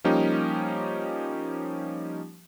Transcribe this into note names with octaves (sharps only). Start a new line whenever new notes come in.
F3 G3 A#3 C#4 D#4 G4